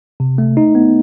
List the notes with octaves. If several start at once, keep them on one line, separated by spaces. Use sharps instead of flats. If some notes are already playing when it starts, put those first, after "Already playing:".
C3
A3
D#4
B3